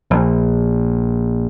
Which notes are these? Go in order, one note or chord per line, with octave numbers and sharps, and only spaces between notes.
A#1